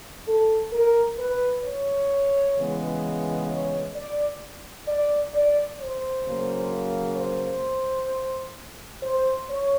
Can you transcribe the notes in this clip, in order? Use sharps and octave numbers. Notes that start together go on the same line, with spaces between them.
A4
A#4
B4
C#5
C#3 E3 G#3 B3
C#5
D5
D5
D5
C5
C#3 F#3 A#3
C5
C5
C#5